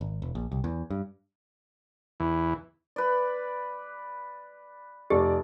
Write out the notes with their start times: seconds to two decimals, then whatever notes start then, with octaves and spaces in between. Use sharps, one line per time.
0.01 G#1
0.22 E1
0.35 A#1
0.52 C2
0.64 E2
0.90 G2
2.20 E2
2.96 B4 D5
5.10 F1 G4 D5